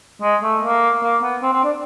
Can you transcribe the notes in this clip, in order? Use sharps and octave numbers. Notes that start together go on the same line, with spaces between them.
G#3
A3
A#3
A#3
B3
C4
C4
D4